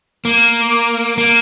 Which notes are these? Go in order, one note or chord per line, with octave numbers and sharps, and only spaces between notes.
A#3
A#3